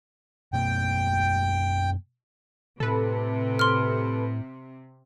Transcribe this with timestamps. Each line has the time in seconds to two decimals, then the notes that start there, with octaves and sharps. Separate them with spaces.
0.53 F#2 B2 A#3 G5
2.80 A2 C3 A4 B4
3.59 C6 F6